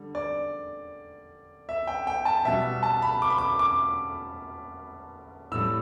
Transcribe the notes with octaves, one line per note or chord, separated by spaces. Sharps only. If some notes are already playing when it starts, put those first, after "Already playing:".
Already playing: D3 G3
D5
E5
G5
G5
A5
B2 G3 E5
A5
B5
D6
B5
D6
D6
A2 G3 E6